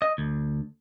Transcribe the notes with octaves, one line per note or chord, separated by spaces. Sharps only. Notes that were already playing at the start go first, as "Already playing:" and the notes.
D#5
D2